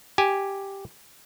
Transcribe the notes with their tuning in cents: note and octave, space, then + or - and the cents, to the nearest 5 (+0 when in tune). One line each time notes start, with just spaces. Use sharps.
G4 +0 G#5 +0